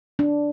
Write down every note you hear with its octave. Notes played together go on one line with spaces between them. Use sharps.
D4